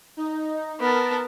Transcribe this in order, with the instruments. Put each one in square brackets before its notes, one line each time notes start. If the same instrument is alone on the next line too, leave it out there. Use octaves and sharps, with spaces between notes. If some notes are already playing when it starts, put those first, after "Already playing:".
[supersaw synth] D#4
[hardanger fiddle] B3 [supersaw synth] A#4 A5